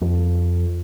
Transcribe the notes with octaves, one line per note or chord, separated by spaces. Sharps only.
F2